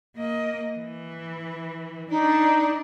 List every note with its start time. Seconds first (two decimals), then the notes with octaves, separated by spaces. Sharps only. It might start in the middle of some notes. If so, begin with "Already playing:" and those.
0.16 A#3 D#5
0.78 E3
2.10 D4 D#4 D5